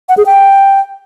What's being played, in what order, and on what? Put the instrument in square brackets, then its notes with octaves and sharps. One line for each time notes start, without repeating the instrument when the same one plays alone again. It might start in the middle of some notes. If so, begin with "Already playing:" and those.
[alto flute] F#5
G#4
G5